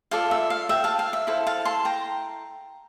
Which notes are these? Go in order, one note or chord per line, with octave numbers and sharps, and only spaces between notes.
F4 A4 D5 F5
E5
F5
E5 G5
F5 A5
F5
E5
E4 A4 C5 F5
F5 A5
A5 C6
G5 A#5